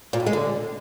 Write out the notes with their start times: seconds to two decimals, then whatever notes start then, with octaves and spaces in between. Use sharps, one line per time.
0.13 A#2
0.20 A2
0.26 G#3
0.33 D3